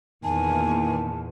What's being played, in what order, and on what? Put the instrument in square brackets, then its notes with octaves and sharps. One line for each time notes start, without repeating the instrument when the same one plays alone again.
[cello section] E2 A#2 [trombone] D#3 [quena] G#5 [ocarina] A5